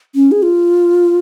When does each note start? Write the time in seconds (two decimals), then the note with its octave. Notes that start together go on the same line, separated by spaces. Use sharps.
0.15 C#4
0.32 G#4
0.43 F4